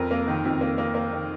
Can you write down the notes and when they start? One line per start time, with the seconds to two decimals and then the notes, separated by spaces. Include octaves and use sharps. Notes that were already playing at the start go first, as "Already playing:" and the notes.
Already playing: F2 A#4
0.11 A#3
0.28 D#3
0.45 F2
0.61 A#3
0.78 A#3
0.95 A#3
1.13 D#3